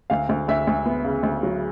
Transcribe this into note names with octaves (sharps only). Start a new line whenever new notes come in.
D2 F5
D2
D2 E5
D2
B3
C#3
D2
F#3